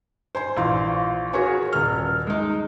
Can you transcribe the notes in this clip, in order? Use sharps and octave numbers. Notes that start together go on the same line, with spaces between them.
C5 G#5 C6
A#1 E3 F5 C6
F#4 G#4 A#4 B4 C#5 G#5
D#1 F6
G#3 D#4